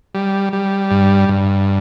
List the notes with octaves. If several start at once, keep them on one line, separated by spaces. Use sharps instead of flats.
G3
G3
G2
G2